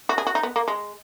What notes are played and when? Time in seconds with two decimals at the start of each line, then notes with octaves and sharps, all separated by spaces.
0.09 F#4
0.18 G#4
0.27 F#4
0.35 D#4
0.43 B3
0.56 A#3
0.68 G#3